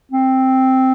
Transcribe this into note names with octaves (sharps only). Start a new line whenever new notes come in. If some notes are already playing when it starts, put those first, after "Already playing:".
C4